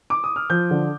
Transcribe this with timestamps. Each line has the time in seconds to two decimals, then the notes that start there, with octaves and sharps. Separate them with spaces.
0.10 D6
0.24 D#6
0.36 F6
0.50 F3 G6
0.71 D3